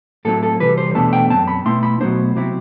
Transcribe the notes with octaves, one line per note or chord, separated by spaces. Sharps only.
A2 F#3 C4 E4 A4
A4
C3 E3 G3 B4
C5
E2 B2 A3 D4 A5
G5
F#2 F#3 C4 A5
B5
B2 A3 E4 C6
B5
B2 F#3 A3 D4 C5
C3 F#3 C4 E4